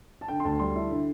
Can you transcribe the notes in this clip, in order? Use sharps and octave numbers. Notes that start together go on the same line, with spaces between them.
A5
D3 G5
C6
D2 A5
G3 C6
E4
D3